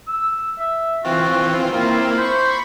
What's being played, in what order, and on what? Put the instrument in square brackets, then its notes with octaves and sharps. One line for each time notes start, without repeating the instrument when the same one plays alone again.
[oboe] E6
E5
[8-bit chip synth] E3 C4 F4 [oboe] F#4
[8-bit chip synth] A#3 C4 E4 [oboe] F4
[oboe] C5 [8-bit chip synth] B5 C#6